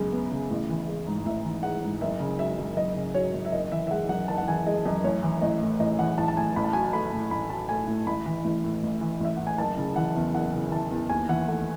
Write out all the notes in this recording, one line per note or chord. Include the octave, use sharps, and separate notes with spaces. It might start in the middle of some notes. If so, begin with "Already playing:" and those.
Already playing: F#2 C#3 G#3 B3
B3
C#3
A1
E3
G#3
G#2
A1 E5
E3
G#3 F#5
G#2
F#1 E5
C#3
F#3 E5
F#2
F#1 D#5
C#3
F#3 C#5
F#2
E5
F#1 D#5
E3 E5
E5
G#3 F#5
F#2 F#5
F#1 A5
F#5
E3 G#5
G#3 D#5
F#2 D#5
A1 C#5
E3
A1 D#5
A2
A1 D#5
E3 F#5
A1 A5
A5
A2 G#5
A1 B5
A5
F#3 G#5
A5
A3 B5
A2
A1 B5
F#3 A5
A3 G#5
A2
A1 B5
E3
A1
A2
A1
E3
A1 E5
A2 F#5
G#5
F#1 A5
C#3
E3 F#5
E2
F#1 F#5
C#3
E3 A5
E2
D#2 G#5
E3 F#5
A3 F#5